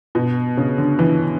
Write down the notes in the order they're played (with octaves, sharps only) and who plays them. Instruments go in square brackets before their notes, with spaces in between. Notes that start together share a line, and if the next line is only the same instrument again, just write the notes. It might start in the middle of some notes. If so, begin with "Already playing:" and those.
[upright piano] B2
C#3
D3
E3